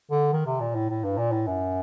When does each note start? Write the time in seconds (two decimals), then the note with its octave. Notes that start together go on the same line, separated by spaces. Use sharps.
0.11 D3
0.33 D#3
0.46 C3
0.60 A#2
0.75 A2
0.89 A2
1.04 G2
1.18 A#2
1.32 A2
1.47 F#2